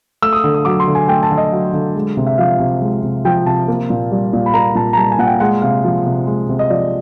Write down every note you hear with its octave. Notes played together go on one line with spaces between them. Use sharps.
A3 E6
D#6
D3
D#6
F#3 D6
C6
D3
G#5
A3 G5
A5
D3
D#5
F#3
D3
G#3
C3
E5
F3 F5
C3
G#3
C3
F3 G5
C3 A5
A#3
A#2
G3
A#2
B5
A#3 A#5
A#2 A5
A#5
G3 A5
G#5
A#2 F#5
G5
G#3 F#5
C3 F5
F3
C3
G#3
C3
D#5
F3 D5